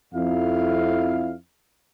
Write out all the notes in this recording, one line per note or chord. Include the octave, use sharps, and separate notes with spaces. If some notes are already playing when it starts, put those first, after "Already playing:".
F2 E4 F5